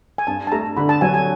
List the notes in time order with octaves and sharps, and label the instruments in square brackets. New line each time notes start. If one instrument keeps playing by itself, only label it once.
[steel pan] G#5
[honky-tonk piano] G2 [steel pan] A5
[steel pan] A5
[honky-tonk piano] A3 [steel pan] A#5
[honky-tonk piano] D3 [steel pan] B5
[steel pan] A5
[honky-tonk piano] F#3 [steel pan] G#5
[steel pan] G#5